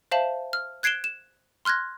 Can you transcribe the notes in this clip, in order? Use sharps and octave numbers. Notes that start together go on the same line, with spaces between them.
C5 E5 F5 A5 E7 F#7
F6
F#6 G#6 C7 D7 E7 G7
E7
C6 F6 F#6 G#6 A#6